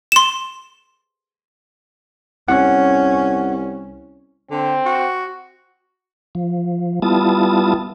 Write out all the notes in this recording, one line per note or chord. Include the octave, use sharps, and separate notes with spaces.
C6 E7
C2 C#4 F#5
D3 C4
F#4
F3
G3 B3 E4 F4 A5 D#6